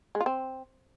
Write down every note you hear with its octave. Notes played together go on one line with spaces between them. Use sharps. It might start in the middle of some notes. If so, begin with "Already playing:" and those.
G#3
F4
C4